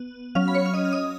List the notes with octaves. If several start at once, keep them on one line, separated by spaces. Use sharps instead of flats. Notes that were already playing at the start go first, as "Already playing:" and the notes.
Already playing: B3
F#3 C#4 F5 F6
B5
C#5 C#6
F6
D#5 D#6
F6
D#5 D#6